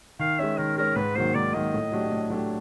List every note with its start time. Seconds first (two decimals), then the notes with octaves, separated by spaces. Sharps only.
0.19 D#3 F5
0.39 G#3 C#4 E5
0.58 D#3 A#4
0.77 G#3 C#4 A#4
0.96 G#2 B4
1.15 D#3 F#3 A#3 C5
1.34 G#2 D5
1.54 D#3 F#3 A#3 D#5
1.73 A2
1.92 F#3 A3 D4 G4
2.11 A2
2.30 F#3 A3 D4 G4